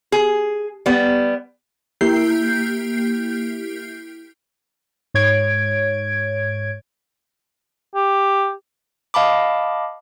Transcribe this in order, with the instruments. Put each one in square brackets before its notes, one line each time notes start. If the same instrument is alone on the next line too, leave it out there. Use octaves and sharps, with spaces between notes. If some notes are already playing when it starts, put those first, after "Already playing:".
[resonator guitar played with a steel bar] G#4
G3 B3
[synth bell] A#3 E4 G4 G6 C7
[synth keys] G#2 C#5 G#6 D7
[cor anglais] G4
[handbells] D#5 F5 A5 B5 D6